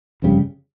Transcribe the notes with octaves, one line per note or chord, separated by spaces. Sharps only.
G1 F2 C#3 G3